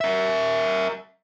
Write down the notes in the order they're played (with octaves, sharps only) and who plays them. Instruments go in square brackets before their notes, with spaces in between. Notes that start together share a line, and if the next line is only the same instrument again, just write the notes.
[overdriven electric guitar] A#4 E5